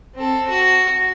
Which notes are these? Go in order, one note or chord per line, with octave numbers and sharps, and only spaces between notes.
C4 A4
F#4